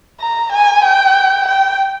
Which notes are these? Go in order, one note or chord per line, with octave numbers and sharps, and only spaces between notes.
A#5
G#5
G5
G5